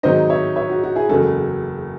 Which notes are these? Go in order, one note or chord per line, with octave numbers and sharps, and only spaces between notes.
G#2 D#3 F#3 C4 D#4 C5 D#5
C#5 E5
C#5 E5
F#4
F#4
E4 G#4
F#1 E2 C#3 G#3 F#4 A4